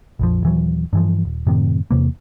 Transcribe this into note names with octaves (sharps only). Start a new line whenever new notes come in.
A#1 F2 F3
D#1 E3 F#3
G2 E3 F3
D#1
F#2 A2 C3 D#3
E2 C3 A#3